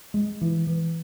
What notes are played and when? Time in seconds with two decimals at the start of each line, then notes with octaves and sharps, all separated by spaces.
0.14 G#3
0.41 E3
0.67 E3